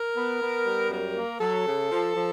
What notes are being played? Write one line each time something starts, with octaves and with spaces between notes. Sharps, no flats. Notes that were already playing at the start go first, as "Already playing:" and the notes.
Already playing: A#4
B3
B3
G3
F#2 A#4
A#3
F#3 A4
C#3
F3
F3